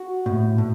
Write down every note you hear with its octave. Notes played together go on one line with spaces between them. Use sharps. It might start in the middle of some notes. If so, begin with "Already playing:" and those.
Already playing: F#4
A2
A2